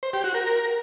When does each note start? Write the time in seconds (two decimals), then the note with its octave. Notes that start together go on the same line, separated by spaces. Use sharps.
0.03 C5
0.13 G4
0.24 F#4
0.35 A#4